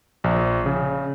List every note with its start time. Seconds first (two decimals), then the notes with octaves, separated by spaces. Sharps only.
0.24 A#1
0.66 C#3